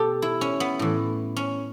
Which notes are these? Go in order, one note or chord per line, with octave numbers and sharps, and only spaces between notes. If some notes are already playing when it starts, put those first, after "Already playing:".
Already playing: B2 G4 A4
E4
C#4
B3
A2 E3
C#4